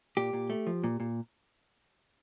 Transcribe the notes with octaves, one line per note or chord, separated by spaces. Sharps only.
A#2 G4
A#2
A3
F3
A#2
A#2